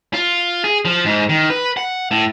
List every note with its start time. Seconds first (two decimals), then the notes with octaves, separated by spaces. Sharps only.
0.14 F4
0.64 G#4
0.85 F3
1.05 G#2
1.29 D#3
1.50 B4
1.77 F#5
2.11 A2